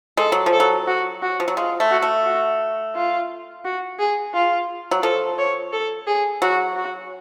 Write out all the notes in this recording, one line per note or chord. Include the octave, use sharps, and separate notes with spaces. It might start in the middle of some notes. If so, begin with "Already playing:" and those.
G#3 A4
F#3
F3
A4
F#3
F#4
F#4
F3
F#3
G#3 F4
A3
F#4
A3
F#4
F4
F#4
G#4
F4
F#3
F3 A4
C#5
A4
G#4
F#3 F#4
F#4